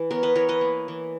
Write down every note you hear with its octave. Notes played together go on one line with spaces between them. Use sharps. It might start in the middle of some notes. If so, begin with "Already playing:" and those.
Already playing: E3
B3 A#4 C#5
B4 D#5
E3 A#4 C#5
B4 D#5
A#3
E3